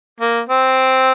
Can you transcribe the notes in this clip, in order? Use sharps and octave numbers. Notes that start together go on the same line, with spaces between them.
A#3
C4